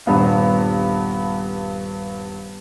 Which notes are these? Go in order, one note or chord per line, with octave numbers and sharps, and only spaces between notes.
D#1 G2 B3 F5